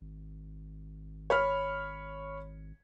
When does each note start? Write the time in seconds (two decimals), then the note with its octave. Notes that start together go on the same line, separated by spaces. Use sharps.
0.01 G#1
1.30 C#5 B5 F6